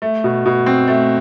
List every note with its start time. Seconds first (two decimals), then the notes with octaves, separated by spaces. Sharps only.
0.02 A3
0.24 B2
0.46 B2
0.66 C4
0.88 A3